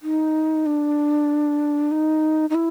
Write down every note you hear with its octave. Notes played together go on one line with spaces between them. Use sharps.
D#4
D4
D#4
D#4
E4